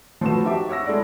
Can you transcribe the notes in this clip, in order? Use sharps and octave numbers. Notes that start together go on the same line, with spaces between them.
F3 A3 B3 F#4 E7
D#4 F#4 G4 E5 A5 D6
C#5 F#5 E6 A#6
G#3 E4 A4 D5